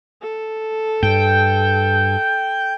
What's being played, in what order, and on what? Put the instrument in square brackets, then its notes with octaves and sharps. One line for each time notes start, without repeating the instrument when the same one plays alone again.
[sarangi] A4
[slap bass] G2 [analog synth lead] G5